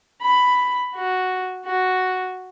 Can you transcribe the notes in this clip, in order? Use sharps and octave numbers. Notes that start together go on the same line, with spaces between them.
B5
F#4
F#4